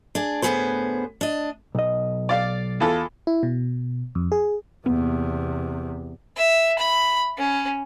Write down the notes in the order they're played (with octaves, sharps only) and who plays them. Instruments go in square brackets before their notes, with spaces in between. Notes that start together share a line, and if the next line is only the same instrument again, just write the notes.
[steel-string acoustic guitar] D4 G#4
D2 A2 D#3 B3 G#4 C5
D4 D#5
[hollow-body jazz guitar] B1 D#5
[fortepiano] D5 F5
E2 F4 A4
[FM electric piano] E4
B2
F2
G#4
[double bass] E2 C3 [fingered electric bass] A#3 B3
[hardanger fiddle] E5
B5
C#4